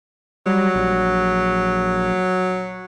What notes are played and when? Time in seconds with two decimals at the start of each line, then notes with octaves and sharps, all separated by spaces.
0.46 F#3 G3
0.74 A#1